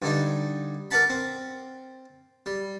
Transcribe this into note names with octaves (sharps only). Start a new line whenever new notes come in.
G2 D3 D4 D#4
A#4 B4 D5 F#5 A5 B5
C4
G3